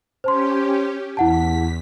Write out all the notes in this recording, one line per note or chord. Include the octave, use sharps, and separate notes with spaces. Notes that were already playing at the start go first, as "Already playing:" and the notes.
C#4 G4 C5 A5 C6
E2 E4 F#5 A5 B6